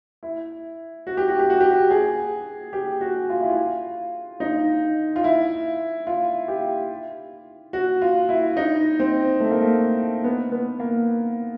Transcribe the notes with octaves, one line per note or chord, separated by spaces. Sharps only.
E4
F#4
G4
F#4
G4
F#4
G4
F#4
G#4
G4
F#4
F4
E4
F4
D#4
F4
E4
F4
G4
F#4
F4
E4
D#4
C4
A3
A#3
A3
B3
B3
A#3